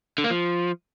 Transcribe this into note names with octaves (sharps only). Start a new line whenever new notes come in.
D3
A#3
F3